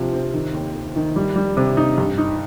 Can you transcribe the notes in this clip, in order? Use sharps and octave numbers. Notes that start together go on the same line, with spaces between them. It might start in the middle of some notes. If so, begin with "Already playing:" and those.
Already playing: C3 F3
C4
D#3
D#2
D#2
D#3
G3
G3
C3
D#4
G2
D#4